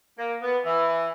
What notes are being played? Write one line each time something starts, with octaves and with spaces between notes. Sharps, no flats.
A#3
B3
E3